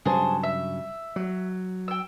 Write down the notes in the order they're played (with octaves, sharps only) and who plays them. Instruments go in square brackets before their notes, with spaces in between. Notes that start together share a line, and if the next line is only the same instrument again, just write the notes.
[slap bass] G2 C#3 F#3 [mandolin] G#4 C5 A5
[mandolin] E5
[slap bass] F#3
[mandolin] G5 E6